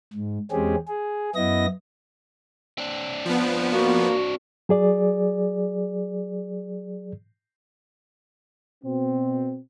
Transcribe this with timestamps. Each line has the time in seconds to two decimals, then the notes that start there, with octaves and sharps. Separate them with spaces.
0.13 G#2
0.51 E2 G#3 C4 C#4 G4 G#4
0.88 G#4
1.35 F#2 B3 E4 D#5 A#6
2.78 C4 D4
3.25 F3 B3
3.72 A#3 F#4
4.69 F#3 G#4 D5
8.84 B2 C4